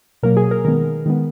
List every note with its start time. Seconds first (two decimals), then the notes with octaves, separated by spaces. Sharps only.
0.23 B2 F#3 A#3 A#4
0.37 G#4
0.51 A#4
0.65 D#3 G#3 B3 A#4
1.06 D#3 G#3 B3